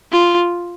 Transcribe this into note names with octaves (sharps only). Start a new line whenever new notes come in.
F4